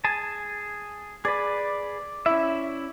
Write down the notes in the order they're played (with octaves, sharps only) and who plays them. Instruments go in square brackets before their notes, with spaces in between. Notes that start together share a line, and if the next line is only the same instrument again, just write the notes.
[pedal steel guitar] G#4 G#5 A5
[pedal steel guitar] G#4 B4 [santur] D5
[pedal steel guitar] C#4 E5 [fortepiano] E4